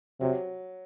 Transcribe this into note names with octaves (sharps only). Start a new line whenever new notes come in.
C3 F#3